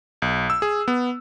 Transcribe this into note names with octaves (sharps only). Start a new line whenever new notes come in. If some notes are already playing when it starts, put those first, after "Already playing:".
B1
E6
G#4
B3